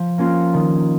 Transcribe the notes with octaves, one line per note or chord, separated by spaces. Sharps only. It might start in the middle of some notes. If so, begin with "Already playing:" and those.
Already playing: F3
A#3 C#4 F4
D#3